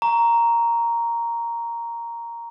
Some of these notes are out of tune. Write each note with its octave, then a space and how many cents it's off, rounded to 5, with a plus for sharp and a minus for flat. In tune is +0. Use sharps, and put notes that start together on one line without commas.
A#5 +0 C#6 +25